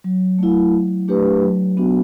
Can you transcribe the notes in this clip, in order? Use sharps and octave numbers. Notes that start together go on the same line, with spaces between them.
F#3
A3 E4
F#3
A3 D4 G4 B4
F#3
B3 D4 F#4